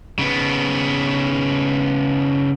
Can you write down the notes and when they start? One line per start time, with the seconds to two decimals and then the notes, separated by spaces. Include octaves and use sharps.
0.19 C#3 B3